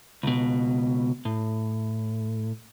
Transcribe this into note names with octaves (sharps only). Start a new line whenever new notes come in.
C#2 B2
A2